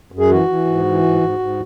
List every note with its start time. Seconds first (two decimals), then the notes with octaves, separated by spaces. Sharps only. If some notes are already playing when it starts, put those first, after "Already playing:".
0.12 F#2
0.19 G#4
0.30 E3 F#4
0.48 E3
0.66 G#2
0.85 E3
1.03 G#2
1.21 G#2
1.39 G#2